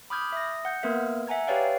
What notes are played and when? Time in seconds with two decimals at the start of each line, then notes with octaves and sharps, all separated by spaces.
0.10 B5 D6 D#6 F6 G6 G#6
0.32 E5 D#6 A#6
0.65 F#5 G6
0.83 A#3 B3 A#4 B4 E5
1.27 E5 F#5 G#5 A#5 G#6
1.47 G4 B4 C#5 D5 F5 G5